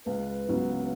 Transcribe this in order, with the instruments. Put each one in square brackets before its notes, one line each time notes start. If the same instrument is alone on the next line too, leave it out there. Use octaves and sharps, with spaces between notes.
[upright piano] C#2 [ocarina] B4
[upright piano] C#3 F#3 B3